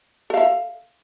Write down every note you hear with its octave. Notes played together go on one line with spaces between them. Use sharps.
A4 E5 F5